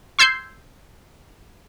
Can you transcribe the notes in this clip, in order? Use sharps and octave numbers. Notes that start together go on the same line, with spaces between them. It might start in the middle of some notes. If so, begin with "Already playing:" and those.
C6 E6 G6 G#6 C7